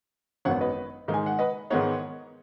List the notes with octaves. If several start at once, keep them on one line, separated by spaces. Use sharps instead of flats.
G#1 F#2 D#3 B3 C#5 F#5
B4 D#5
G#2 D#3 G#3 D#4
G#5
F#5
B4 D#5
G#2 D#3 G#3 B3 D#4 C#5 F#5